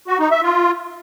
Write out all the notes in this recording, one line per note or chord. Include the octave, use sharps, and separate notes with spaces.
F#4
D#4
E5
F4